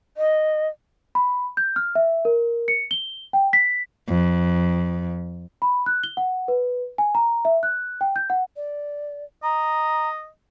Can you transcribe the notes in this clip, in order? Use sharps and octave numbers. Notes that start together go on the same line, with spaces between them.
D#5
B5
G6
F6
E5
A#4
C#7
G7
G5
B6
F2
B5
F#6
G7
F#5
B4
G#5
A#5
E5
F#6
G5
G6
F#5
D5
D#5 A#5